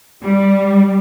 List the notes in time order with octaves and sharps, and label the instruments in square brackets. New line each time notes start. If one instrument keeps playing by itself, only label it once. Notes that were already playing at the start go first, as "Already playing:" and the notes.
[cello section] G3